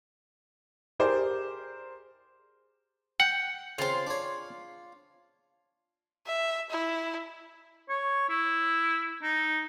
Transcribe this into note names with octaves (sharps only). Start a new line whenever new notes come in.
G4 G#4 A#4 C5 D5 D6
F#5 G5
C#3 C4 F4 C6
D4 C#5
E5
E4
C#5
E4
D#4